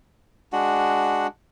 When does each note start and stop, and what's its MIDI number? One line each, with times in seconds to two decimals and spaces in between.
0.53 1.27 56
0.53 1.27 62
0.53 1.27 66
0.53 1.27 78